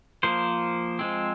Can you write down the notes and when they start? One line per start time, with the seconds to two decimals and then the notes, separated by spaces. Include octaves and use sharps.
0.23 F3 A#3 C5
0.99 F3 G#3 C4